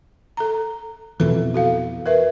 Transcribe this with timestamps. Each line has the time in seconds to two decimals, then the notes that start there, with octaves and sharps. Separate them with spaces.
0.37 A4 A#5
1.20 F2 B2 E3 A4
1.54 F#4 A4 F5
2.06 A#4 B4 E5